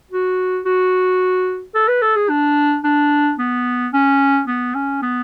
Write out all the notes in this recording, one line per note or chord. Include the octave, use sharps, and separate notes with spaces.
F#4
F#4
A4
B4
A4
G#4
D4
D4
B3
C#4
B3
C#4
B3